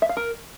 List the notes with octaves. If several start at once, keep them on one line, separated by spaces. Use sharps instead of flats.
E5
F5
A#4